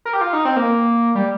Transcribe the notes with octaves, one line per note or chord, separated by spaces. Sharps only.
A#4
G4
F4
D#4
C4
A#3
G3